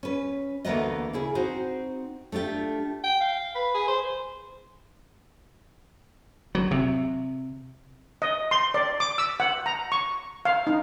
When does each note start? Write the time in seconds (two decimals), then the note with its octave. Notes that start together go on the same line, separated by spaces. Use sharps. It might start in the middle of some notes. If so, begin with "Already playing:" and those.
0.03 C#4 B4
0.65 D2 E3 A#3 B3 B4 D#5
1.13 C#3 E4 G#4
1.35 C4 D#4 F#4 C5
2.32 A3 D4 F4 G4
3.04 G5
3.20 F5
3.55 B4
3.74 G#4
3.88 C5
6.55 F#3
6.71 C3
8.22 D#5
8.51 C6
8.74 D5
9.00 D6
9.18 E6
9.40 F#5
9.66 A#5
9.92 C#6
10.45 F5
10.67 D#4